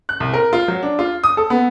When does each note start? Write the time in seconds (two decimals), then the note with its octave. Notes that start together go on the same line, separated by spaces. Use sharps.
0.09 F#6
0.20 C2
0.34 A#4
0.53 F4
0.68 F#3
0.83 D4
0.99 F4
1.24 D#6
1.37 A4
1.50 B3